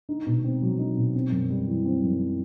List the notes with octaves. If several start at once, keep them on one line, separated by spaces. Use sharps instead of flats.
D#4
B2
C4
F#3
D#4
B2
C4
F#2
G3
E3
C4
F#2